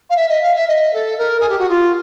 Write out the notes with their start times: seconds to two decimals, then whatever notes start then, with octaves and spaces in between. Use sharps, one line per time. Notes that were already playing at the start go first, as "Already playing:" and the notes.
0.09 F5
0.16 E5
0.29 D#5
0.42 F5
0.55 E5
0.67 D#5
0.93 A4
1.18 A#4
1.39 G#4
1.48 G4
1.58 F#4
1.69 F4